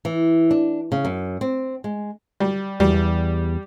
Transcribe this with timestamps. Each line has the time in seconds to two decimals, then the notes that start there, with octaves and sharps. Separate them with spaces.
0.05 E3
0.51 D4
0.92 C#3
1.05 F#2
1.41 C4
1.84 G#3
2.40 G3
2.80 E2 G3